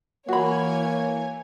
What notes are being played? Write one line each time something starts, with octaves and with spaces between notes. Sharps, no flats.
E3 A#3 F#4 C#5 G#5 B5